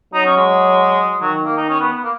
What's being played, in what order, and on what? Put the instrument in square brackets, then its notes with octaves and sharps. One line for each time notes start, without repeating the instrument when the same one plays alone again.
[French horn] F#3 [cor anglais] D#4
[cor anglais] C#4
G#3
[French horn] D#3 [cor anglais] F#3
[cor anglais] A#3
D#4
C#4
B3
B3
A#3